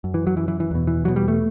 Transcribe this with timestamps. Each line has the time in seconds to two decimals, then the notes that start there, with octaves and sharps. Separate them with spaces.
0.04 F#2
0.14 E3
0.27 F#3
0.37 F#2 E3
0.48 E3
0.60 E3
0.71 E2 B2
0.87 E3
1.04 E2 B2 F#3
1.16 G3
1.28 A3